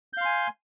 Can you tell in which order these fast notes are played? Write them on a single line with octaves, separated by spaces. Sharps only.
G6 F5 C6 G#5